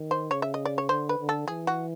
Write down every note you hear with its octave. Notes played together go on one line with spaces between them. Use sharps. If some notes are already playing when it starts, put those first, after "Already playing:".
Already playing: D#3
C5
C#3 C#5
E5
D#5
D5
C#5
D3 C5
B4
D3
A4
E3 G#4
F#4